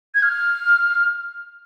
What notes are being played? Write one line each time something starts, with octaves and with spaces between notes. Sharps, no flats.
G#6
F6